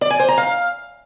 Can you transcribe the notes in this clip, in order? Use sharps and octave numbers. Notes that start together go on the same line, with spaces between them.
D5
G#5
C5
A#5
F5